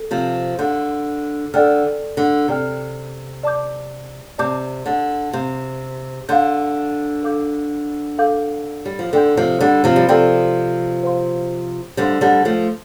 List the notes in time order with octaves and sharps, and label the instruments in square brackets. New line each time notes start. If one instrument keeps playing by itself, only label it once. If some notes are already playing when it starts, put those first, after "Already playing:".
Already playing: [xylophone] A4
[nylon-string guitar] C3 F3
[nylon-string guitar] D3 [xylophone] A4 F5 C6 G6
[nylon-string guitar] D3 [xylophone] A4 D5 G5 F6
[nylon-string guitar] D3
[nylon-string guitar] C3 [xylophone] A4 D5 G5 F6
[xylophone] D5 A5 D6 G6
[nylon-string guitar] C3 [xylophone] D5 A5 D6 G6
[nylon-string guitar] D3
[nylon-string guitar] C3 [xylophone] F5 C6 G6
[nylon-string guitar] D3 [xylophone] F5 C6 G6
[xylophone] A4 F5 D6 G6
A4 F5 D6 G6
[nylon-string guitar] G3
F3
[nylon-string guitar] D3 [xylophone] A4 D5 G5 C6 G6
[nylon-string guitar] C3 F3
D3 G3
C3 F3
G3
[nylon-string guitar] C3 F3 [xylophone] A4 D5 G5 C6 G6
[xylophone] C5 F5 C6
[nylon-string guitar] D3 G3 [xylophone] C5 F5 C6
[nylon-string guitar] D3 G3
F3 A3